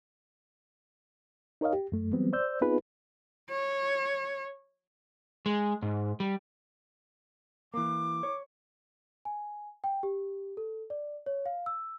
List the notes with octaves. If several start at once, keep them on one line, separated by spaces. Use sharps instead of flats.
D#4 A#4 C#5 D#5 F5
G4
F#2 A3
E3 F#3 G3 B3 C4
C5 D5 E6 G6
B3 C4 D#4 F4 G#4 B4
C#5
G#3
G#2
G3
E3 A#3 D6
C#5
G#5
G5
G4
A4
D5
C#5
F5
E6